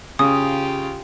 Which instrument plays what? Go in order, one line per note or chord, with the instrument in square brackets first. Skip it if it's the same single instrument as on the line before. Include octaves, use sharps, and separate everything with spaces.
[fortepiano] C#3 [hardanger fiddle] F4 G4 [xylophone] D#6